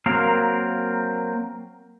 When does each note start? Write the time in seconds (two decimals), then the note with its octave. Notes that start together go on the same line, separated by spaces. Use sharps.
0.06 F#3 A#3 C4 A#4 F5